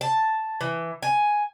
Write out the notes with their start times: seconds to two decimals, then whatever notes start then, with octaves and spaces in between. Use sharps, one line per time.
0.01 A5
0.61 E3
1.03 G#5